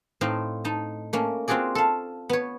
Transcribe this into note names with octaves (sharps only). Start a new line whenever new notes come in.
A2 C4 D#4 F5
D#4 A5
A3 A#3 C#4
C4 F4 F#4 G#4 D5
A4 F5
B3 C#5